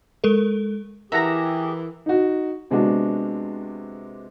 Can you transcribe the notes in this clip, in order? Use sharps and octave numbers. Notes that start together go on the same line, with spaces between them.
G#3 A4 A#4
E3 G4 G#4 A#4 E5 F#5 A#5 A#6
D#4 F#4
C3 G#3 B3 D4 F#4